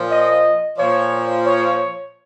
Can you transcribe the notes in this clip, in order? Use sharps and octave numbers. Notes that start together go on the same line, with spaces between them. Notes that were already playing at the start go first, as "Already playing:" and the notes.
Already playing: A#2 F3
D#5
A#2 F3 C#5
C#5